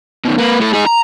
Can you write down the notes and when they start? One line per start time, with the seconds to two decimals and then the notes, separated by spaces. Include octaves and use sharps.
0.25 B2 D#3
0.38 A#3 B4
0.60 A2 A4
0.74 D#4 G#4
0.86 A#5